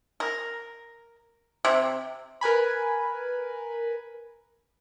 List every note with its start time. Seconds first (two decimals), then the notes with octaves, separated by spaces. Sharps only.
0.20 A#4
1.65 C3
2.41 A#4 B4 G#5 B5